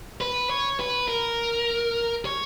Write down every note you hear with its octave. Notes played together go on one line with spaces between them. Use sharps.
B4
C#5
B4
A#4
C#5